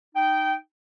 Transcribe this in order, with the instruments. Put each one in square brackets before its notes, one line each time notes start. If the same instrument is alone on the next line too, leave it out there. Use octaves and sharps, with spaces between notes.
[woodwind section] D#4 G5